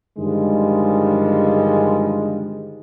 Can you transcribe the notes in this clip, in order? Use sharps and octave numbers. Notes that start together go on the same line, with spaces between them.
G2 D3 D#3 F3 G3 G#3